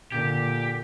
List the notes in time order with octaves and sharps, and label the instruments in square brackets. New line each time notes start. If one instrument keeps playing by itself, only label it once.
[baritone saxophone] A#2 [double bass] D3 [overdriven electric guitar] G4